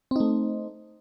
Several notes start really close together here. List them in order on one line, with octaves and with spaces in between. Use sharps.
C4 D#4 A3